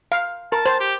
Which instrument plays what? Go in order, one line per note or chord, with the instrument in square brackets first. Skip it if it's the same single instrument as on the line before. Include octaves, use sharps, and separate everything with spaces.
[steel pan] F5
[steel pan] A#4 [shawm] A5
[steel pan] C5
[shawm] G4